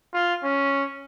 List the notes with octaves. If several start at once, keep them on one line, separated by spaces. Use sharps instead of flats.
F4
C#4